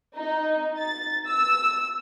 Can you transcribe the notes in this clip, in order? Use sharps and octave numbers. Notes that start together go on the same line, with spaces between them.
D#4
A6
E6